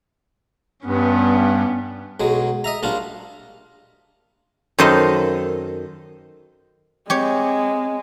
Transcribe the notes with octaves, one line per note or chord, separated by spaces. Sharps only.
G2 B3 C#4
B1 F#3 G#3
D#5 E5 A#5
A#1 G3 D4 F4
F#2 D#3 A4 C5 D#5 F5
G#3 C4 G4 C#5